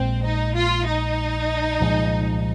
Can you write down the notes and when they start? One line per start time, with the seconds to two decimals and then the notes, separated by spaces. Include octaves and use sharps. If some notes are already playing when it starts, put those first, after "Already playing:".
Already playing: A#1 A#2 G#3 C4
0.24 D#4
0.56 F4
0.87 D#4
1.80 C2 A#2 F3 G#3